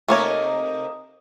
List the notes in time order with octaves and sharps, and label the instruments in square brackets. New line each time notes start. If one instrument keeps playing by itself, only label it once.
[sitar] C3 D#4 A#4 [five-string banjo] A3 A#3 C#5